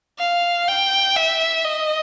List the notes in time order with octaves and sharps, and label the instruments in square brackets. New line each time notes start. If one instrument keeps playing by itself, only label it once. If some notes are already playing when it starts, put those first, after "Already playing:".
[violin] F5
G5
E5
D#5